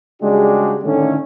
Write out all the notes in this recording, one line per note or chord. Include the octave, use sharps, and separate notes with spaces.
C#3 G3 G#3 D4 F#4 G4
A2 D3 D#3 A3 C#4